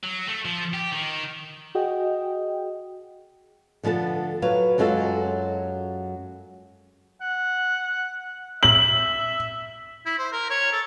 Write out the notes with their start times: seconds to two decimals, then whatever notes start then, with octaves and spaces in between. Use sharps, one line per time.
0.04 F#3
0.28 A3
0.45 F3
0.74 G4
0.92 D#3
1.75 F#4 G#4 D#5 G5
3.83 D3 F3 B3 A4 A5
4.42 F#3 B4 F5
4.78 F#2 F#3 G#3 F4 A4
7.21 F#5
8.63 E5 F#7
10.06 E4
10.18 C5
10.32 A#4
10.50 C#5
10.72 A4